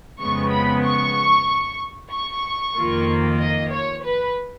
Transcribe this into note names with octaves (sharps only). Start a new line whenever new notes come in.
F2 C#3 G#3 B3 C#6
B5
C#6
C#6
F2 D#3 A#3 F4
D#5
C#5
B4